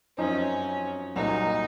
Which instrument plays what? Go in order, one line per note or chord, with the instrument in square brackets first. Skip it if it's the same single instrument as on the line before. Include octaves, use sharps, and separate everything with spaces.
[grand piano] F#2 F3 C4 D#4 [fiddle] C#4
[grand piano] C2 A#2 F#3 [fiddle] D#4